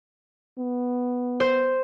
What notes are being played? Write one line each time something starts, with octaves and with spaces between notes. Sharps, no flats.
B3
C5